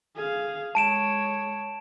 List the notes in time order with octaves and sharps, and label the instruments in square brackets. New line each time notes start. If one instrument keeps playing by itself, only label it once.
[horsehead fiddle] G#4 F5
[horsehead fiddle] G#3 C#5 [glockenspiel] A5 D7 E7